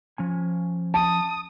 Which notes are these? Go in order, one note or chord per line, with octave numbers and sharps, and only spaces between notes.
F3 C#4 G#5
A5 D#6